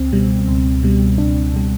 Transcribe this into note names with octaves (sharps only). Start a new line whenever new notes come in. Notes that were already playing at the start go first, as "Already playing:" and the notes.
Already playing: C#2 C4
B2 G3
C#2
B2 G3
C#2 D4
B2 G3